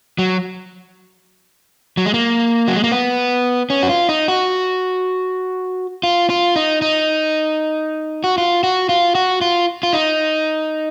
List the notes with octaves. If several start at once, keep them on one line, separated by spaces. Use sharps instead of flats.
F#3
F#3
G#3
A#3
F#3
G#3
A#3
B3
C#4
F#4
F4
D#4
F#4
F4
F4
D#4
D#4
F#4
F4
F#4
F4
F#4
F4
F4
D#4